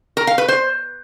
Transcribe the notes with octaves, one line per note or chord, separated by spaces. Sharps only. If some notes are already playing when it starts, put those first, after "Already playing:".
A#4
F5
B4
C5